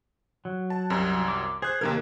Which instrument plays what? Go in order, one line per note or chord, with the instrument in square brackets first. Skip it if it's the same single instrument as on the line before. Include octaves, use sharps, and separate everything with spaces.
[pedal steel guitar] F#3
[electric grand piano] A5
C2 F#2 C3
[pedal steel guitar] D6
[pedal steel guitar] G#4 [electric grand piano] C5 F#6
[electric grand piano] D#2 C3 G#6 [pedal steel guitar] A#3 D#4 A#4